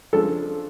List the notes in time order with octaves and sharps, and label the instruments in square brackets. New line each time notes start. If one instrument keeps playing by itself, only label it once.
[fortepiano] C#3 F3 G#3 D4 [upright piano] A4